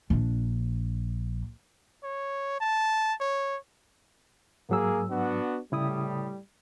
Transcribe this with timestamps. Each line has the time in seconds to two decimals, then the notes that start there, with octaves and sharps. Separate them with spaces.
0.10 A#1 D4
2.04 C#5
2.61 A5
3.21 C#5
4.69 G#2 F#3 A#3 G#4 E6
5.09 B3 D4 F#4
5.72 A2 C#3 G3 E4 D#6